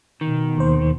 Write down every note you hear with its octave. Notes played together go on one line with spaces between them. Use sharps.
B2 D#3
D#2 C5